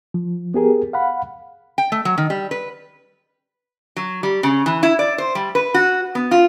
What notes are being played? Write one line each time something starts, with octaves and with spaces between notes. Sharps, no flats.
F3
B3 G4 G#4 A#4
F5 F#5 B5
G5
A3
F#3
D#3
G3
B4
F#3
G3
C#3
E3
E4
D5
C5
G3
B4
F#4
B3
F4